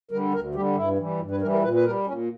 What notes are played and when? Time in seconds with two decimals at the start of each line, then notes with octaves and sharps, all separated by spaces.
0.11 D3 G3 A#4
0.34 D2 A#4
0.55 D3 G3 G4
0.76 G2 E4
0.98 E3 G3
1.20 G2
1.31 B4
1.41 E3 G3 A#4
1.53 A#4
1.62 A#2 B4
1.74 B4
1.84 G3 A#4
2.07 A#2 C#4